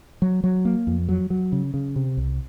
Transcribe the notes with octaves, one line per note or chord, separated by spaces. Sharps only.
F#3
F#3
A#3
F2
F#3
F#3
C#3
C#3
C3
C2